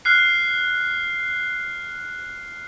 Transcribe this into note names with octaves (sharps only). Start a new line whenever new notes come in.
F6 F#6 C7